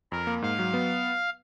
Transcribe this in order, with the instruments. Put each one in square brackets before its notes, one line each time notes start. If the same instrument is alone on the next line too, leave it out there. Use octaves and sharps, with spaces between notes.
[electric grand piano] F2 [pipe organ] A#4
[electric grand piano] A#3
[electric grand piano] G#2 [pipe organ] F5
[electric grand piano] F#3
B3